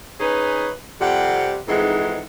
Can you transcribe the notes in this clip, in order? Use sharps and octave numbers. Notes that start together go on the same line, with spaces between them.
C#4 D#4 G#4 B4
F2 C3 G3 F#5
F2 G#2 E3 G#3 D#4 F#5